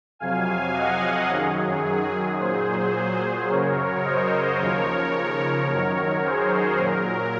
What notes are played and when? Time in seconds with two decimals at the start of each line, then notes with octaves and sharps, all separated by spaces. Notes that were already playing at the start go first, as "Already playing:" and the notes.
0.19 F2 C3 F#3 F5 G#5
0.74 D#5 F#5
1.30 F#2 D#3 F#3 G#4
2.39 A#2 F#3 G#4 C5
3.49 F#2 C#3 F#3 A#4 C#5
4.04 C5 D#5
4.58 D#2 C#3 F3 A#4 C#5
5.69 F#2 D#3 F#3
6.23 G#4 C5
6.78 A#2 F#3 A#4